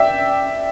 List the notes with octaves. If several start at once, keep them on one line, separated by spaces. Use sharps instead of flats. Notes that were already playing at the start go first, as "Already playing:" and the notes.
Already playing: D5 E5 G5